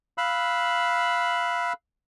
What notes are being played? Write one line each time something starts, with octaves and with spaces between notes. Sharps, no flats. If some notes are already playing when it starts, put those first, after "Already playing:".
F5 B5 E6 F#6